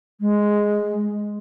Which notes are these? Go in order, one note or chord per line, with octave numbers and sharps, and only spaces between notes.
G#3